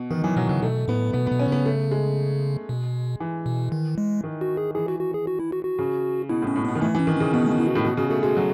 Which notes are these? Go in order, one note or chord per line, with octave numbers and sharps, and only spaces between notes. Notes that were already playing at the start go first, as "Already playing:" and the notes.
Already playing: B2
D#3 E3
E3 F#3
B2 F#3
C#3 F#3
B2 A3
A2 B3
B2 B3
B2 B3
C#4
C#3 B3
A3
G#3
B2
E3
B2
D#3
G#3
D#3
F#4
G#4
E3 G#4
F#4
F#4
G#4
F#4
E4
F#4
F#4
C#3
B2 E4
A2
C#4
A2
B2 B3
D#3
E3 A3
E3 C#4
D#3
C#3 C#4
B2 B3
A3
B3
E4
F#4
A2
B2 F#4
C#3 F#4
A3 F#4
G#3 F#4
F#3